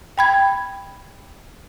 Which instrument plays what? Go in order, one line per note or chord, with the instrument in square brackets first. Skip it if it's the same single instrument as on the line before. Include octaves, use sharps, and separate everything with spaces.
[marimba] G5 B5 G#6